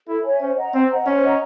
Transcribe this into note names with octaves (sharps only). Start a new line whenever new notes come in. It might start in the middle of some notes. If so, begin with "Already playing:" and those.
E4 A4
C#5 E5 G#5
C#4 C5
D#5 F#5 A#5
C4 C5
D#5 F#5 A#5
C#4 C5
D#5 F#5 A#5